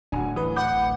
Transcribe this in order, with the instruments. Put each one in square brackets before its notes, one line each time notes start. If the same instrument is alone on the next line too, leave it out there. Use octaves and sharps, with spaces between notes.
[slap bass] D1 [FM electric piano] D4 [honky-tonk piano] F#4 G#5
[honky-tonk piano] E3 [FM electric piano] B4 D#6
[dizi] F#5 [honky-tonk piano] B5 D6 G6
[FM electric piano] A1